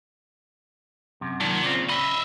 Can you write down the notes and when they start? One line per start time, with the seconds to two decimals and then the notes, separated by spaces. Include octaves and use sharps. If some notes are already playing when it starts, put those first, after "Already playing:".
1.21 F#2 C3
1.41 A#2 D#3 F#3 A5
1.64 C#3 C4 F4
1.89 D#5 E5 B5